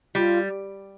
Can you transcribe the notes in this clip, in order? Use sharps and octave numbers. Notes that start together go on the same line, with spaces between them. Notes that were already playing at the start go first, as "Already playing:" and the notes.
G3 F4